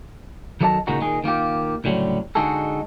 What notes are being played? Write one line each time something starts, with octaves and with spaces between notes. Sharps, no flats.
D#3 F#3 A4 D5 D#5 A5
C#2 A#2 D#3 G#3 D#4 F#4
A#2 D#3 G#4
D#3 A#3 F4 G4
C#2 A2 D3 F#3 G3
D3 G#3 D#4 F#4 G#4 A4